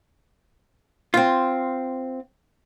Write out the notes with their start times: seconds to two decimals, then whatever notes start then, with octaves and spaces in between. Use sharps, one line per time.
1.14 C4 F4